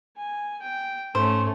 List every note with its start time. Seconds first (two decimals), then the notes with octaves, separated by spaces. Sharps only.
0.17 G#5
0.62 G5
1.15 G#2 A3 C#4 C5